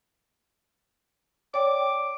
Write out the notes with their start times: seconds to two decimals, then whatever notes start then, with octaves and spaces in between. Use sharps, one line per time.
1.54 C#5 D5 G5 D6